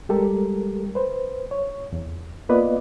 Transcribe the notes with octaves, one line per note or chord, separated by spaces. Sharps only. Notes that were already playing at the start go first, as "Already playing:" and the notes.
G3 G#3 G4 A4 A#4
B4 C5
C#5
E2
A#3 B3 F4 B4 D5 D#5